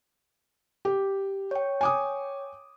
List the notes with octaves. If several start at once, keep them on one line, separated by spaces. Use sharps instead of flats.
G4
C#5 G5
G#5 D6 D#6